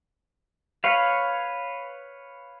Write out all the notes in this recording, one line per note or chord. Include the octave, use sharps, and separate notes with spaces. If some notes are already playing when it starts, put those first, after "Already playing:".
B4 C#5 F5